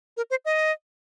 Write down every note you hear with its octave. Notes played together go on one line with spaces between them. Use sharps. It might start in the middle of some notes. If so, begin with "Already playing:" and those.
A#4
C5
D#5